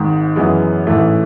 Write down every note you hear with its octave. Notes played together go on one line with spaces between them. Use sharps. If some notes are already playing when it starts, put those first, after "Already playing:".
Already playing: G#1 G#2 D#3
F#2 E3 G#3 B3
A1 G#2 E3 A3